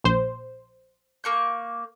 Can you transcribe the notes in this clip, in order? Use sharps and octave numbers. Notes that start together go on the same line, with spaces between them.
A#1 C5
A#3 C#6 G6